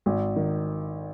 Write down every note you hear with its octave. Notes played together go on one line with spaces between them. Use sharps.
G#1
D#3